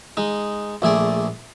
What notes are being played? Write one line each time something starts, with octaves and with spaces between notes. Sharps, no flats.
G#3 D#4
A#1 A3 G#4 D5